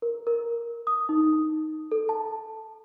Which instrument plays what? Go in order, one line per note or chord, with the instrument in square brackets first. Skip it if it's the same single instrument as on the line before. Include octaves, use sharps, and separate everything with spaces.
[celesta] A#4
A#4
D#6
D#4
A4
A5